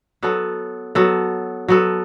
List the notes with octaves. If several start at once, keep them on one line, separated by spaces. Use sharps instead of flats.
F#3 B3 A4
F#3 B3 A4
F#3 B3 A4